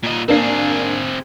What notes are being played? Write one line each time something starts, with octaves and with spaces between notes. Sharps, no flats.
A#2 D#5
A#3 C4 D4 G#4 C7